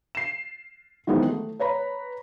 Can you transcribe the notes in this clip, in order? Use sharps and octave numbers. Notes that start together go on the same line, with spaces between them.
C7 E7
D#3 E3 F#3 G#3 B3 C4
A3
B4 C#5 A#5 B5